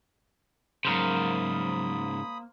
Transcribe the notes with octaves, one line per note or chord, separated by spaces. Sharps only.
G#2 C#3 F#3 A#3 A#4 C5 B5 D#6